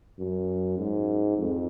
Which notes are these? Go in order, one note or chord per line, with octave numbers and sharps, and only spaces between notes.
F#2
G#2
F2